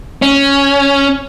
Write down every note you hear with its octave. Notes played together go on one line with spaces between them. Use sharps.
C#4